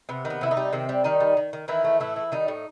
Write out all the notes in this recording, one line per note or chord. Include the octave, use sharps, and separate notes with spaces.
C3 B3
D#3
B3
C3 E4
D#3 D#4
G3
C3 D#3 C4
G3
D#3 G3 D#4
G3
D#3
D#3
D#3 E3 E4
A3
A2 E3 E4
E3
D#3 G3 D#4
A2